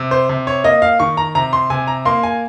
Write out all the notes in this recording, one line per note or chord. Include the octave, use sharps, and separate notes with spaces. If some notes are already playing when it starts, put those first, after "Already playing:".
Already playing: C3
C5
C3
C#5
A#3 D#5
F5
D#3 C#6
A#5
C3 A#5
C6
C3 G#5
A#5
A#3 C6
G#5